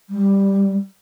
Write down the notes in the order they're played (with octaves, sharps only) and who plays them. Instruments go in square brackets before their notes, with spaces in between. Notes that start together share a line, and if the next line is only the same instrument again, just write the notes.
[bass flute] G3